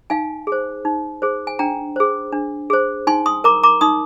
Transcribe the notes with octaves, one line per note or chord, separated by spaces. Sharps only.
D#4 F5 G#5
G#4 C5
D#4
G#4 C5
G#5
D4 G5 A#5
G#4 C5
D4
G#4 C5
D#4 G#5 C6
C6 D#6
A#4 A#5 D6
A#5 D6
D#4 C6 D#6